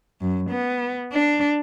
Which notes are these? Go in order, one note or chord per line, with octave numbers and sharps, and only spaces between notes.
F#2
B3
D4